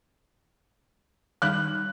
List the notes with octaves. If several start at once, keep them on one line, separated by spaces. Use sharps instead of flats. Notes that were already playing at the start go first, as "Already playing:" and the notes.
D#3 G3 D#4 F#6